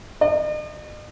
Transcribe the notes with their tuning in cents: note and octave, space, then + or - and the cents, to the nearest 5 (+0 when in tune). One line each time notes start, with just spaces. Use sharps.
D#5 -45